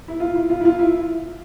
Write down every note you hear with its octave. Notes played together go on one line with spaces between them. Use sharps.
E4
F4
E4
F4
E4
F4
E4